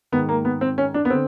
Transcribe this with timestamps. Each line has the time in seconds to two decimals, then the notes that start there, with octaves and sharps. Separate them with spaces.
0.12 G#2 D#3 B3
0.29 A#3
0.45 B3
0.61 C4
0.78 C#4
0.94 D4
1.05 B3
1.10 D3 C4